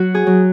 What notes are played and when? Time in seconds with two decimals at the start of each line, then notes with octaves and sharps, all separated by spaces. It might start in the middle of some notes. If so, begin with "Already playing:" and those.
Already playing: F#3 F#4
0.14 G#4
0.27 F#3